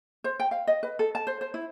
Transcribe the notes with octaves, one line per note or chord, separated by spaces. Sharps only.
C5
G5
F5
D#5
B4
A4
A5
C5
C5
E4